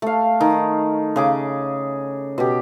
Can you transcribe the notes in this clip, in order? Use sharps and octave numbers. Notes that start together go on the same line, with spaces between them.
A3 F5
D#3
C#3 G#4 D6
B2 G4